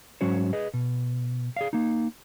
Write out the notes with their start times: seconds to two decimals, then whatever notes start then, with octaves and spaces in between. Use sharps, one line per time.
0.21 G#2 F#3 C#4 F#4 C5 C#5
0.53 G#4 B4 D#5
0.74 B2
1.56 G#4 D5 F5
1.73 A#3 D#4